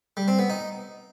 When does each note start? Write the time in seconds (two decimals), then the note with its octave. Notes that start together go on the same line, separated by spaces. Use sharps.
0.17 G3
0.28 C4
0.39 B3
0.50 D#4